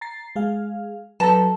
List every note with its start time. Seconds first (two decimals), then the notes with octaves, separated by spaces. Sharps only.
0.01 A#5 A6 C7
0.36 G#3 G#4 F5
1.20 F#3 A4 B4 A5 A#5